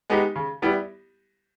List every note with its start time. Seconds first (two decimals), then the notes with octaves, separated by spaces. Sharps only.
0.10 G#3 B3 D#4 G4
0.36 C#3
0.62 G3 B3 E4 G4